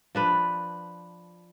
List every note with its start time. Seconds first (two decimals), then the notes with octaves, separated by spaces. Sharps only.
0.15 F3 D4 B4